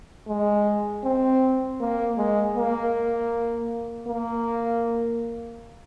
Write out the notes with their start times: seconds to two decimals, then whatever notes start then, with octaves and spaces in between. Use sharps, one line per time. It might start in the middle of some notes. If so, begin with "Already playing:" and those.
0.28 G#3
1.04 C4
1.80 A#3
2.18 G#3
2.57 A#3
4.08 A#3